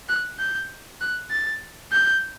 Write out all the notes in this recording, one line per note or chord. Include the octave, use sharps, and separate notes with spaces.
F#6
G6
F#6
A6
G6